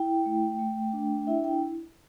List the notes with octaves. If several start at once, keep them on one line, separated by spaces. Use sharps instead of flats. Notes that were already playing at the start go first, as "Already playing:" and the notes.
Already playing: E4 G5
A3
A3
D4
E4 E5
G5